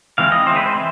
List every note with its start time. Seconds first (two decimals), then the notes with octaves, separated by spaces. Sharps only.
0.18 E3 G#3 C4 F5
0.32 D#5
0.46 E3 G#3 C4 C5
0.56 B4
0.66 C5
0.75 E3